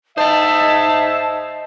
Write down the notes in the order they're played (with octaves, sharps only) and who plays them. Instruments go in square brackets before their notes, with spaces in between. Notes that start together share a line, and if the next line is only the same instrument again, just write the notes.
[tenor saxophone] D#4 [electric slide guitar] C5 D#5 [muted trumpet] E5 [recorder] A5